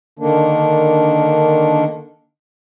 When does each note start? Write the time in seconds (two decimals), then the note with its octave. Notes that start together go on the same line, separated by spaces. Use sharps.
0.19 D3 D#3 A#3 D4